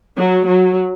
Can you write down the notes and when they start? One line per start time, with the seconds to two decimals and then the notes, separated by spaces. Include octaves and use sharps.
0.17 F#3
0.46 F#3